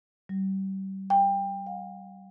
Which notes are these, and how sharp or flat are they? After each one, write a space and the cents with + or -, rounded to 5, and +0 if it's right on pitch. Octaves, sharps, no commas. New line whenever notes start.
G3 -30
G5 +20
F5 +45